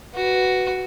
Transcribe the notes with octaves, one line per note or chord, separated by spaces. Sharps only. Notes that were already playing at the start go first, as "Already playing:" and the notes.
F#4 B4